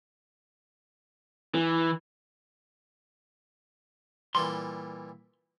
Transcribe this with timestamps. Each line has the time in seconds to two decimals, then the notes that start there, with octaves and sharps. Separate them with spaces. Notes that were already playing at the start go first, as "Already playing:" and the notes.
1.55 E3
4.35 A#2 E3 G3 C6